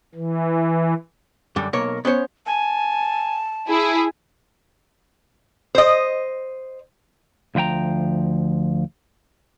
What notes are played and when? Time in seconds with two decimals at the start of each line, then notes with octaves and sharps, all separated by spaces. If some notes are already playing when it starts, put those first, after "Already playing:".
0.15 E3
1.56 F#2 D3 G3
1.73 B1 A#3 A#4 C#5
2.05 B3 C#4 C5 C#5
2.46 G#5 A5
3.68 E4 G#4 G#5 E6
5.75 C5 D#5
7.55 D2 F3 B4 G5 A#5